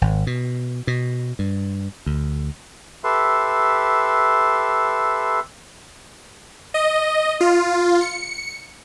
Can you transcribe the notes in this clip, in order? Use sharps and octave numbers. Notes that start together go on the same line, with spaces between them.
G#1
B2
B2
G2
D2
G4 A4 B4 E5 C6
D#5
F4
C#7